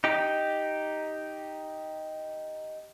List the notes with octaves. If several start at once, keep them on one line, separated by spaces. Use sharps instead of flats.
D#4 G4